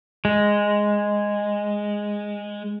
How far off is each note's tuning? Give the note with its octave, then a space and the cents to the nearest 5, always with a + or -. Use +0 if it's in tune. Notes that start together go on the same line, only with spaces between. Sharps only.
G#3 -5